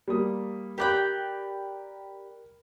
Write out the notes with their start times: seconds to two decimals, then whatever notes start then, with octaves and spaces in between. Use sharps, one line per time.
0.08 G3 A#3 D#6
0.78 G4 A#4 D5 G5 B5 F#6